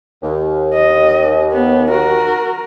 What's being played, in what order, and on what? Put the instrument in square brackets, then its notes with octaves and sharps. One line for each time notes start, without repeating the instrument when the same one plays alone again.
[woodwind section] D#2
[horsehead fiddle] D#5
B3
F#4 A#4